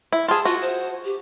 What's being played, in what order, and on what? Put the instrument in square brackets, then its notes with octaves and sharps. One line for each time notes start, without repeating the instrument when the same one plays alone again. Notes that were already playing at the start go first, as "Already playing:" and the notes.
[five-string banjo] E4
[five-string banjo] F4 G#4 [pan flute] A5
[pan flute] F4 [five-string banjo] F#4
[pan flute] C5
G4